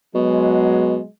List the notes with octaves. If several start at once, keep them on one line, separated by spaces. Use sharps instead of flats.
B2 F#3 G#3